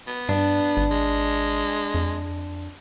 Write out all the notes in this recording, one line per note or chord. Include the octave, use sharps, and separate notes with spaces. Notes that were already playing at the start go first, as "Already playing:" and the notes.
B3
G2 D4
G#1
G#3
F2